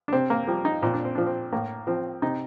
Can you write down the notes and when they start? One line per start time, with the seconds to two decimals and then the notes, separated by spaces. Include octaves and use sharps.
0.08 D4
0.13 C3 C4
0.30 A#3
0.47 F3 G3
0.65 D#4
0.83 A#2 C4
0.94 D4
1.05 C4
1.15 F3 D4
1.26 C4
1.52 A2 A#3
1.87 F3 C4
2.22 C3 D#4